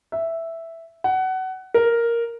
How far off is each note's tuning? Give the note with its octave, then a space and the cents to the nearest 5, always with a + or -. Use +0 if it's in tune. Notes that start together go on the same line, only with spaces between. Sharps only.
E5 +0
F#5 +20
A#4 +0